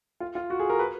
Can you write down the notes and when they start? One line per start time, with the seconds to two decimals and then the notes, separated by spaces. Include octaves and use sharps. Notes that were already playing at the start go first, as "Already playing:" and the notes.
0.20 F4
0.35 F4
0.50 F#4
0.60 G#4
0.70 A#4
0.79 B4